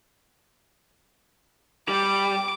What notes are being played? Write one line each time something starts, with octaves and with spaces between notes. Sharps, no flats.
G3 D6